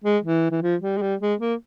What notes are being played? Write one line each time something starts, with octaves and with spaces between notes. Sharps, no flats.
G#3
E3
E3
F3
G3
G#3
G3
G#3
A#3